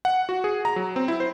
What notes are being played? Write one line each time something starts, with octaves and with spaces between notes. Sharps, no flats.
F#5
F#4
G#4
A#5
F#3
C4
E4
C5